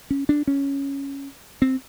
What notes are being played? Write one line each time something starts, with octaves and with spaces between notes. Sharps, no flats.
C#4
D4
C#4
C4